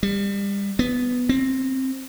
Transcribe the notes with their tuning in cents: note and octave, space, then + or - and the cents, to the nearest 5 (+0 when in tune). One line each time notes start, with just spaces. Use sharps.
G3 +30
B3 +5
C4 +15